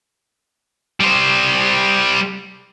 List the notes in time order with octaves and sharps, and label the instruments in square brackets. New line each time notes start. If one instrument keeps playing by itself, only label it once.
[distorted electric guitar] G3 C5